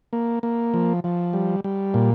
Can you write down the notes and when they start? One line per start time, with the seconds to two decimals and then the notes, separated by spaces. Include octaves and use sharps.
0.13 A#3
0.43 A#3
0.74 F3
1.04 F3
1.33 G3
1.64 G3
1.94 A#2